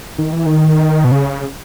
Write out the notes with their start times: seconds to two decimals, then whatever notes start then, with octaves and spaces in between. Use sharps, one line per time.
0.19 D#3
0.33 E3
0.46 D#3
1.04 B2
1.12 C#3